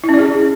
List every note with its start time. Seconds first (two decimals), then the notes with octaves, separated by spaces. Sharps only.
0.04 E4
0.09 C#4
0.14 D5
0.19 G#4